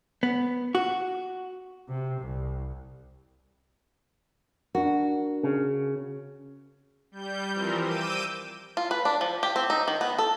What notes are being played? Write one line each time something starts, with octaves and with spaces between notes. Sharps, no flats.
B3
F#4
C3
C2
D4 F#4 A#4
C#3
G3 G6
E3 F3 G3 C4 A#4
D6 E6 G6 D#7
F4
B4
D4
F3
G4
C4
D#4
D#3
B3
A4